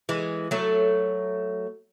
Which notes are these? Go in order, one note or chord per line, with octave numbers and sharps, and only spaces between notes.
E3 G#3
F#3 A3